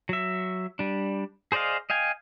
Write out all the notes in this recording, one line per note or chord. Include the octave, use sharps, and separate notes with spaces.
F#3 E5
G3 D4
G#4 C5 D5 D#5 F5
D#5 F5 G5 G#5